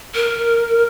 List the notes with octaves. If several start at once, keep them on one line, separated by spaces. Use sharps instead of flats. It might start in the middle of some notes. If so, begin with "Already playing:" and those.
A#4